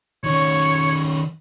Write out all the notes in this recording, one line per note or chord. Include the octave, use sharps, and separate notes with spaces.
D#3 C#4 C#5